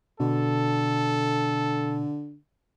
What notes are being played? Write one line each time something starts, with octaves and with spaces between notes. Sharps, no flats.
B2 D3 A4